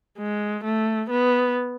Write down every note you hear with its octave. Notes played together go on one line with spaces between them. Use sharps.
G#3
A3
B3